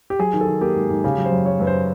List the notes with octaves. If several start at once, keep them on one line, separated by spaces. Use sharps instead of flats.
G4
F#3 G#4
D#3
A4
D#3
A#3 G4
G#2
G#2
C#3 G4
F#3
C5
F#2
F#3 C#5
F#2 B4
C5